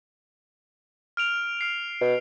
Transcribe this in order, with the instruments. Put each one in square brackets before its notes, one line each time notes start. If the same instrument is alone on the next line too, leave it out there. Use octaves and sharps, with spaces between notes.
[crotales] F6 D7 F7
F6 C7
[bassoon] B2